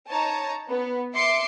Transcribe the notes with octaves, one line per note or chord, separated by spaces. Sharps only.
D#4 C#5 A5 A#5
B3
E5 C6 D6 C7 C#7